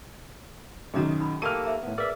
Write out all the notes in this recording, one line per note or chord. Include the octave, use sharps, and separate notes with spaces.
F#2 B2 D#3 G#4 D#5 A#5
D#4 B5
A#3 G4 A4 C#6 F6 D#7
C5 E5 A#5
A2 B3
G#4 A#4 B4 D5 E5